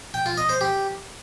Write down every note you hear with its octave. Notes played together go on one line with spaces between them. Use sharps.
G5
F4
D#5
C5
G4